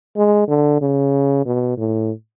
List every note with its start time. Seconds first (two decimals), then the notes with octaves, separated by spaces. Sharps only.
0.17 G#3
0.48 D3
0.81 C#3
1.46 B2
1.77 A2